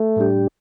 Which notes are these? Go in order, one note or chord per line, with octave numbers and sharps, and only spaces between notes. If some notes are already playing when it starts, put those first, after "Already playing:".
Already playing: A3
A2 G3 D4 G4